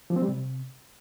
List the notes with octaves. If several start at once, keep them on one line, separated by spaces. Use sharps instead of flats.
F3
C4
G3
C3